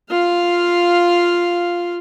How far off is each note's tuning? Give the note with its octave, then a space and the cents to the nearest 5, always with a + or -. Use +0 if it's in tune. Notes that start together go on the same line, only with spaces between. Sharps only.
F4 +0 F5 +0